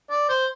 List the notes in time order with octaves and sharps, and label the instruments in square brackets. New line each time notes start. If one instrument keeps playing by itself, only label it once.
[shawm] D5
C5